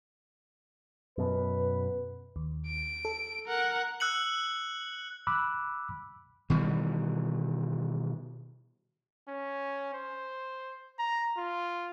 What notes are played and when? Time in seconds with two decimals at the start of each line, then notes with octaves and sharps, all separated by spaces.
1.18 F#2 B2 B4
2.36 D#2
2.67 D7
3.05 A4
3.47 A#4 F#5
4.00 E6 F#6 C#7 F#7
5.27 B5 D6 E6 F#6
6.50 B2 D#3 E3 G3
9.28 C#4
9.93 C5
10.99 A#5
11.37 F4